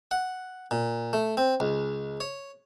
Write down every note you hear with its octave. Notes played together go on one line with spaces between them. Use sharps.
F#5
A#2
A3
C4
C#2
C#5